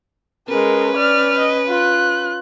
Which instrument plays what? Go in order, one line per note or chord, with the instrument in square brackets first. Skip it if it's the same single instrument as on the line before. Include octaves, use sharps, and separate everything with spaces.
[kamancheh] G#3 A#4 [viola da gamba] C#4 B4
[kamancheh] D5 F6
D#5
F4 F#6